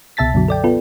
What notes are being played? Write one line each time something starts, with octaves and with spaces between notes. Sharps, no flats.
C2 B2 E5 A5 A6 B6
F#2 B2 D3 F#3
A4 D5 G5
B3 F4 A4 B4